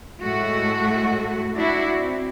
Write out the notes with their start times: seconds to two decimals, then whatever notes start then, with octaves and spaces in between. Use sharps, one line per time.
0.22 A2 G#3 A3 F#4
1.56 D4 E4 F#4
1.98 C4